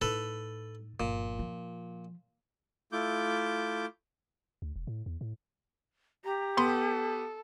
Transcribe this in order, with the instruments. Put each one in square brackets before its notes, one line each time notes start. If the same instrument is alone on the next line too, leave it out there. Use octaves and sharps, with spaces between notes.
[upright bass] A2 D#4 [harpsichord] A4 B4
[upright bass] G1 F3 [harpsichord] A#2
[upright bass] F3
[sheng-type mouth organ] A3 E4 F4 D6 G6
[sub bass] D2
E1
A2
E2
A2
[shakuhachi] G4 [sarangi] A#5
[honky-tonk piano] B3 [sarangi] A4 [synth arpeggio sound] B5 C6